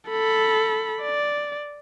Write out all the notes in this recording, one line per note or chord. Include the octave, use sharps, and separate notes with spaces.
A4 B5
D5